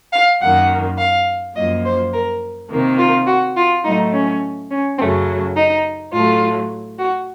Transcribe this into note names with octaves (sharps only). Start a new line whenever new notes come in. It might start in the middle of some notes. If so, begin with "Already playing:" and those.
F5
F#2 D#3 A#3 F#5
F5
F#2 F3 A#3 D#5
C5
A#4
C3 D#3 A#3
F4
F#4
F4
A2 F#3 A3 D#4
C#4
C#4
F#2 C#3 F#3 A3 C4
D#4
A2 F#3 A3 F4
F#4